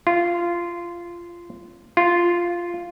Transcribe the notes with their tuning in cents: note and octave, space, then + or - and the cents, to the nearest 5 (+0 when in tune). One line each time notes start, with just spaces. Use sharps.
F4 -15
F4 -5